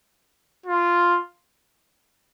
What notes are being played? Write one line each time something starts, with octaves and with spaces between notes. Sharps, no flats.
F4